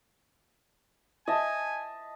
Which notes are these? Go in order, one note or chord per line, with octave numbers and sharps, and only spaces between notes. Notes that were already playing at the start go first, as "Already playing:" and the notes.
D#5 E5 G#5 A5